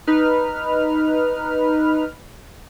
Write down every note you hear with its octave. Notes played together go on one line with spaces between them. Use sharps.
D#4 B4 F6